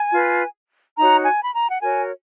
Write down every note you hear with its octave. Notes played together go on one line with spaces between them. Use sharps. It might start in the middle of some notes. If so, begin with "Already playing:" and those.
Already playing: G#5
F4 B4
D#4 F#4 C#5 A#5
G#5
B5
A#5
F#5
F#4 A#4 C#5 G#5